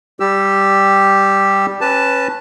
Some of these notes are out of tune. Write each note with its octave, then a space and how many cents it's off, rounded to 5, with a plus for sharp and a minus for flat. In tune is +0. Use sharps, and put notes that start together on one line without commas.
G3 +0 G4 +0 E6 +20
C#4 -25 B4 +0 A5 +0